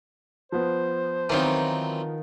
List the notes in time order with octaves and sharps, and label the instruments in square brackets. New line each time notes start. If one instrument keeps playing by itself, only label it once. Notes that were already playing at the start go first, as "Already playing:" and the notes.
[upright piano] F3 B3 [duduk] C5
[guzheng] D#3 F4 A#4 [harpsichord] E3 F#3 C4